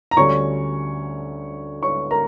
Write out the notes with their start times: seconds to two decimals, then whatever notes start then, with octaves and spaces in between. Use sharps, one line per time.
0.11 A#5
0.17 D2 D3 G3 C#4 C#5 C#6
1.83 C#5 C#6
2.11 A#4 A#5